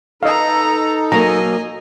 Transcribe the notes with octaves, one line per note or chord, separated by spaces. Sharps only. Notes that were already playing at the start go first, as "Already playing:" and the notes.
D#4 A4 B4 D#5 F5 A#5
F#3 A#3 D#5 G#5 A#5